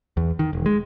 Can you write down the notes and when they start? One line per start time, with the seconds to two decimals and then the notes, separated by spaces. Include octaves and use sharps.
0.17 E2
0.39 D#3
0.53 E1
0.66 G#3